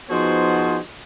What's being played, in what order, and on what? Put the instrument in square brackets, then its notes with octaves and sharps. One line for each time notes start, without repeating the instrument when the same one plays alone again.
[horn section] F3 B3 D#4 F#4 G#4 C5